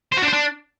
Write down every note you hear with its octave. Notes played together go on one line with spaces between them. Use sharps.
C5
F#4
D4
C5
D4